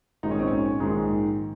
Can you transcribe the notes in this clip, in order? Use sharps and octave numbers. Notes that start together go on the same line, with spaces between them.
A#1 G#2 D#3 G#3 D#4
C#4
C4
C#4
A#1 G#2 D#3 G#3